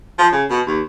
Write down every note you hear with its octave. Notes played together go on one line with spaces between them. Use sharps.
F3
C#3
B2
D#2